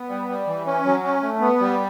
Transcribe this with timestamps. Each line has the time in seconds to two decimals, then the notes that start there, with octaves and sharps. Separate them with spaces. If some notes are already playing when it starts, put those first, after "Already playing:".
Already playing: B3
0.09 G3
0.28 G3
0.47 E3
0.66 C#4
0.86 F#3
1.04 C#4
1.22 A3
1.41 B3
1.61 G3